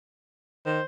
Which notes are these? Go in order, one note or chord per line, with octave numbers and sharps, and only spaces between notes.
D#3 C5